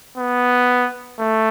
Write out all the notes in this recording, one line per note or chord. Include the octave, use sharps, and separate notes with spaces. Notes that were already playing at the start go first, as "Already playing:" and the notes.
B3
A3